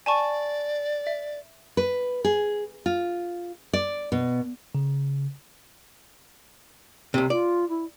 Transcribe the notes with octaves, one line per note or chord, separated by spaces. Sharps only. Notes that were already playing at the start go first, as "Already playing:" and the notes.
D5 G#5 A5 C#6
E5
B4
G#4
F4
D5
B2
C#3
C2 C3
F4 D5
E4